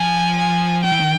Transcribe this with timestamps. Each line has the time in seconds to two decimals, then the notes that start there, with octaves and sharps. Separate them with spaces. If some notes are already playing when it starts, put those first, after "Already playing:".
Already playing: F3 G#5
0.37 G#5
0.84 F3 G5
0.92 E3
1.00 D#3